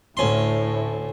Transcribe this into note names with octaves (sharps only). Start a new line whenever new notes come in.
D2 A2 C#4 C6